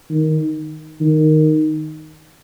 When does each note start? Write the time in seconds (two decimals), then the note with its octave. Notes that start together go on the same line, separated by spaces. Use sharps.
0.10 D#3
1.01 D#3